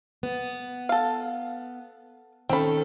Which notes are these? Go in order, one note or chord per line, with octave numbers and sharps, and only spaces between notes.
B3
A4 F5
D#3 C4 C#4 A4 B5